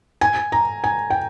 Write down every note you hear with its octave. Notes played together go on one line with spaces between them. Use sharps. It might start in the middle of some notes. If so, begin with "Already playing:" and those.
G#5
A#5
G#5
G5